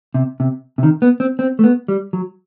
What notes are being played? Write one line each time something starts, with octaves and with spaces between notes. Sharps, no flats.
C3
C3
C3
D#3
B3
C4
C4
A3
B3
G3
F#3